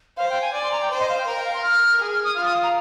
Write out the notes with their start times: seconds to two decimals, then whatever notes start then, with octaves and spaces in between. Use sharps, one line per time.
0.17 C5 F5
0.30 G5
0.41 G#5
0.53 D5 G#5
0.63 C6
0.72 A#5
0.81 G5
0.90 C5
0.99 D#5
1.09 F5
1.18 G5
1.26 A#4 A#5
1.36 G5
1.45 F5
1.54 C6
1.63 F6
2.00 G#4 F6
2.12 F6
2.24 D#6
2.35 F4 F6
2.45 D#6
2.63 A#5